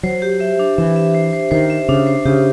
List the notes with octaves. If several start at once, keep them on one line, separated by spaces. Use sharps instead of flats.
F#3 C5
G4
E5
D4
E3 E5
E5
C5
C5
D#3 C5
E5
C#3 D4
C5
C#3 G4